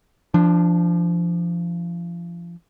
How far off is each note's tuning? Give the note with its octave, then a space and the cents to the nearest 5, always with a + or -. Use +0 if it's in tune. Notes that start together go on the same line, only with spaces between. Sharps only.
F3 -25 D4 +0